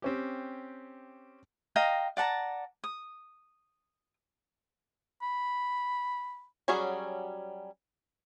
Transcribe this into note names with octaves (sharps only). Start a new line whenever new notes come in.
C4 C#4 G4
D#5 F5 G5 A#5
D5 F#5 A5 A#5
D#6
B5
F#3 G3 C#4 F#4 G#4